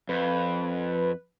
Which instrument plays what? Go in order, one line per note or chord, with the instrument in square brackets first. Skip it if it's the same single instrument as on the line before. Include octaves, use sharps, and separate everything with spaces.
[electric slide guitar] F2 [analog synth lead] B4